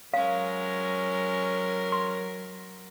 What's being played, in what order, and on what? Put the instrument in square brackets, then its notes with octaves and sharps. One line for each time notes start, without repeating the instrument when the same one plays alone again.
[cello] F#3 A#4 [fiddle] G#3 C#4 [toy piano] F5
[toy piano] C6